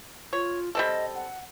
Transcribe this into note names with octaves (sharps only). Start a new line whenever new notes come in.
F4 C#5
G3 C4 A4 D#5
F#5